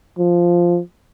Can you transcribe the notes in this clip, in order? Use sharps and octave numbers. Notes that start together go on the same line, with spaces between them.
F3